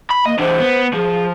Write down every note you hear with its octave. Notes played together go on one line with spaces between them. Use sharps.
B5
A#3 D#5
E3 D4 C5
B3
F3 G#4